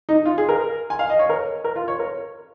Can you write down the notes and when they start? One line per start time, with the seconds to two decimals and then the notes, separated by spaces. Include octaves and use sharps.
0.09 D#4
0.25 F4
0.38 G#4
0.49 A#4
0.90 G#5
0.99 F5
1.10 D#5
1.19 C#5
1.29 A#4
1.64 A#4
1.76 F4
1.88 C#5
1.99 A#4